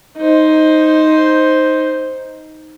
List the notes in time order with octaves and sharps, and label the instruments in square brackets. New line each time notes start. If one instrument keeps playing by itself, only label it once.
[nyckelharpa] D#4 C5